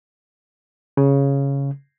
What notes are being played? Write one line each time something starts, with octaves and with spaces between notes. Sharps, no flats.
C#3